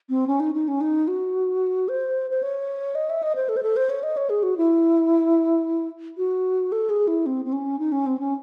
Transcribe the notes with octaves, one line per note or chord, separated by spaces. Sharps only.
C4
C#4
D#4
D#4
C#4
D#4
F#4
C5
C5
C#5
D#5
E5
D#5
C5
A4
C5
A4
C5
C#5
D#5
C#5
G#4
F#4
E4
F#4
A4
G#4
E4
C4
C4
C#4
D#4
C#4
C4
C#4